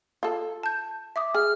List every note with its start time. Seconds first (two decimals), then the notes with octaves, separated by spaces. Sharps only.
0.23 F4 A4
0.63 A5 G6
1.16 E5 D6 D#6
1.34 G#4 F6